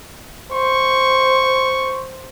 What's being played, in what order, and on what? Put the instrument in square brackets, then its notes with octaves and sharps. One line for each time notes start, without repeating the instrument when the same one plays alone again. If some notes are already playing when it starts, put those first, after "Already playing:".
[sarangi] C5 [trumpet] C#6